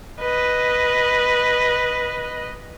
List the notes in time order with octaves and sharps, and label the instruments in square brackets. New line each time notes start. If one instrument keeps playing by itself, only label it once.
[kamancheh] B4 D#5